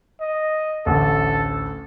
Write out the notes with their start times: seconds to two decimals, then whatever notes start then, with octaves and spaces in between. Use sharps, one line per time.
0.21 D#5
0.86 A1 D2 A4